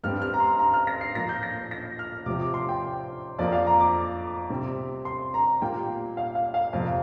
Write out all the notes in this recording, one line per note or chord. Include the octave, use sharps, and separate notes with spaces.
G2 G3 C4 F6
F6
A#5
C6
A#5
F6
A#6
C7
A#2 F3 A#3 A#6
G6
A#6
A#6
F6
C3 F3 C4 D6
D6
C6
G5
F2 F3 A#3 D5
F5
A#5
D6
C3 G3 C4
C6
A#5
A#2 G3 A#3 G5
F5
F5
F5
F2 C3 A#3 F5